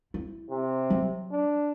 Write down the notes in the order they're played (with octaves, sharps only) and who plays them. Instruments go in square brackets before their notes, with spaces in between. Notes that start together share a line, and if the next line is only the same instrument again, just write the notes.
[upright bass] E4
[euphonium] C3
[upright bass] F#3
[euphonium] D4